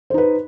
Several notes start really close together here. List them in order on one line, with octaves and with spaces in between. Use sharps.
C5 D#4 B4